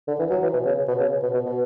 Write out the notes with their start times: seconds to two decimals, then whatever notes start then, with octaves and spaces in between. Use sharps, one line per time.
0.08 D3
0.19 E3
0.31 F#3
0.43 E3
0.54 B2
0.66 C#3
0.88 B2
1.00 C#3
1.23 B2
1.34 B2
1.46 B2